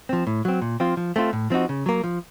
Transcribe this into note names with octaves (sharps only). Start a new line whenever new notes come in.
F3 C4
A2
F#3 C4
A#2
F3 C4 F4
F3
A3 C4 F4
A2
F3 C4 D#4 F#4
C#3
F#3 A#3
F3